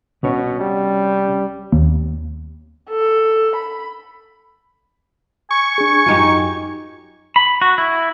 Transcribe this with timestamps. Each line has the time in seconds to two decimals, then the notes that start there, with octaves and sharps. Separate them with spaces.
0.23 C2 B2 C#4 C#5
0.60 G3
1.72 D#2
2.90 A4
3.56 B5
5.51 G#5 C#6
5.78 D4 G#4
6.06 F#2 D#4 F4 G4
7.36 B5
7.61 F#4
7.78 E4